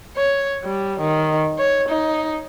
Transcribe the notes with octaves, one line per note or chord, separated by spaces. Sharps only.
C#5
G3
D#3
C#5
D#4